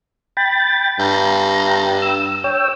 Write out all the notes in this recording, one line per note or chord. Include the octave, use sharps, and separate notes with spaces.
G5 B5 A6
G2 A#5
E6
C#5 G5 E6